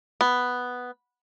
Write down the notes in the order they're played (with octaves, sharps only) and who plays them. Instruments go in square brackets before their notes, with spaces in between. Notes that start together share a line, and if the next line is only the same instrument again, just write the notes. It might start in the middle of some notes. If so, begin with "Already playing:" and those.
[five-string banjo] B3